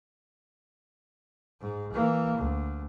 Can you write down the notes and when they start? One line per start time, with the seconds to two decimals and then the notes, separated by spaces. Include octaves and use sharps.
1.61 G#2
1.93 E3 A#3
2.37 D2